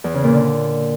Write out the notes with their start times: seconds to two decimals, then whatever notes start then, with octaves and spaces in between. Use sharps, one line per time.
0.04 E2
0.14 C#3
0.24 A#2
0.34 D3